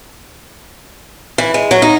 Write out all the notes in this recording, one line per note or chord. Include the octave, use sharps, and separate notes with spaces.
E3
G#3
F#3
D#4